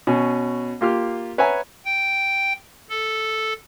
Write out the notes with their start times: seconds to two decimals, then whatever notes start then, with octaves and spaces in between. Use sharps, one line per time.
0.07 B2 C#4
0.81 A#3 F4 G4 F6
1.38 B4 C#5 E5 F#5 G#5 A#5
1.85 G5
2.90 A4